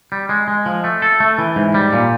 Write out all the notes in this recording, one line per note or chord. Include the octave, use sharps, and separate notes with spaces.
G3
G#3
G#3
F3
A3
A4
A3
E3
G#2
G3
A#2